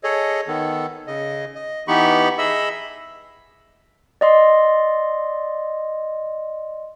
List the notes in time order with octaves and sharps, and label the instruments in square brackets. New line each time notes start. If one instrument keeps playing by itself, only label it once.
[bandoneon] G#4 A4 C#5 D#5
D#3 B3 A4
C#3 D#5
D#5
E3 B3 D#4 G4 B5 C#6
G#4 D#5 E5 B5 E6
[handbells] D5 D#5 C6